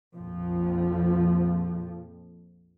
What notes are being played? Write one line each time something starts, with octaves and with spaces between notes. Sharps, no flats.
A#1 F2 F3